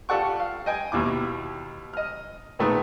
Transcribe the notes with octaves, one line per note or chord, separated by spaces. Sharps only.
F4 G4 A4 D5 F#5 C#6
F5
D#5 G5 G#5
D#2 B2 E4 D6
D#5 F6
A#2 D#3 G#3 A3 B3